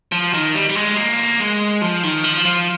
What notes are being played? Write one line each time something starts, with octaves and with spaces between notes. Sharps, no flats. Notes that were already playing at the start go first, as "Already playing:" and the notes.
F3
D#3
G3
G3
G#3
A#3
G#3
F3
D#3
F3
F3